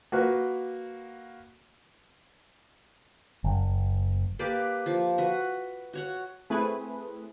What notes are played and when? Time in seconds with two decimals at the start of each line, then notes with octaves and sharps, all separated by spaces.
0.12 A#3 F#4 B4
3.44 F#1
4.39 A#3 G4 B4 D5
4.86 F3
5.18 F#4 B4
5.93 F#4 C#5 F#5
6.50 A3 C4 E4 G#4 B4